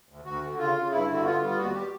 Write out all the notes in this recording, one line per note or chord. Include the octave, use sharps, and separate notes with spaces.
D2
D2 F#4
D3
C#3 F4
C#3
G2 E4
D3
F#4
B3 F4
G3
F4
D#2 F#4
G4